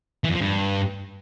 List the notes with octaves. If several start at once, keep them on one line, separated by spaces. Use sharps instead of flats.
E3
F2
F3
G2